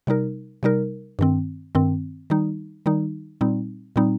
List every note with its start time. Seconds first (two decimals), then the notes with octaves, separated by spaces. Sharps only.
0.07 C3 G3 D#4 A#4
0.63 C3 G3 D#4 A#4
1.19 G2 D#3 C4
1.75 G2 D#3 C4
2.30 D#3 G3 D#4
2.86 D#3 G3 D#4
3.41 A#2 G3 C4 D#4
3.96 A#2 G3 C4 D#4